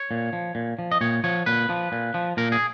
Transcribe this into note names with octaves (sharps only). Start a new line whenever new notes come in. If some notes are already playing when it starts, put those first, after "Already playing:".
Already playing: C#5
A#2
F3
A#2
F3
D#5
A#2 C#5
F3 C#5
A#2 B4
F3
A#2
F3
A#2 A#4
G#4